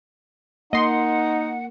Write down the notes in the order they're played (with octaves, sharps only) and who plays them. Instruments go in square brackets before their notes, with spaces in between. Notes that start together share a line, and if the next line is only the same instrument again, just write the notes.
[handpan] A#3 [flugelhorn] D#4 [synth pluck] D#5 C6 [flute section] F#5